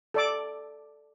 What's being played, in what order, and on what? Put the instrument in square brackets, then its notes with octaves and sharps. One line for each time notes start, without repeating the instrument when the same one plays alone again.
[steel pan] A4 D5 D6